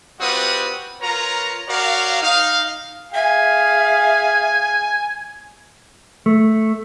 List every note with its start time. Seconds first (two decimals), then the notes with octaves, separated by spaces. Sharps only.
0.21 G3 C4 F4 F#4 B4 D#6
1.02 F4 A#4 B4 C#5 A#5
1.69 F#4 A#4 C#5 D5 F5
2.22 D#4 F5
3.14 G#4 E5 F5 G#5
6.26 A3